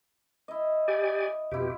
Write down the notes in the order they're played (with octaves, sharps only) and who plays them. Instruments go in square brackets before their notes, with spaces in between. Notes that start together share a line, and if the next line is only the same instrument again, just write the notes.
[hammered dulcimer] E4 D#5
[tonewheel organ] G4 D5 G#5
[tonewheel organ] F2 B2 G4 [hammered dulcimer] E4 F4